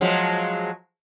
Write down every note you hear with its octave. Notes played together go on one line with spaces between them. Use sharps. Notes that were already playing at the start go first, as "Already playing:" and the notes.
F3 F#3 G#3